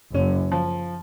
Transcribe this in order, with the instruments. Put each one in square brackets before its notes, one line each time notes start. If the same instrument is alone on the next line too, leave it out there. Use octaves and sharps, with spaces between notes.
[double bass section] F#1 F#2 [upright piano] C#4
[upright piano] F3